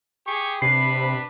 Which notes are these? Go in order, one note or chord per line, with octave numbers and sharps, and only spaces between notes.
G4 G#4 C#6
C3 D4 B4 B5 C7